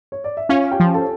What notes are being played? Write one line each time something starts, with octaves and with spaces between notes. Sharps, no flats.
C#5
D5
E5
C#4 F4 F5
G4 G5
F3
A4 A5